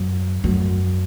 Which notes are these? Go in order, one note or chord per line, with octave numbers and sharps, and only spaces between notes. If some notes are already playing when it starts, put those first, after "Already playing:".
Already playing: F#2
F#2